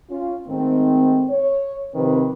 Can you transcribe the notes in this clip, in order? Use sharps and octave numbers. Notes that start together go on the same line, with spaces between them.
C#4 F4
G#2 D#3 A3 C4
C#5
C3 D#3 F3 C4 B4